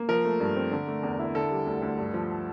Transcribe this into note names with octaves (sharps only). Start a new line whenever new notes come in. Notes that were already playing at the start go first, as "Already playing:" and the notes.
Already playing: A#3
F3 A#4
A3
G2
C4
D3
A3
E2
E4
D3 A4
G3
D2
D2
G2
F3